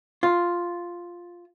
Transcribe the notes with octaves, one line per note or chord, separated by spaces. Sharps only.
F4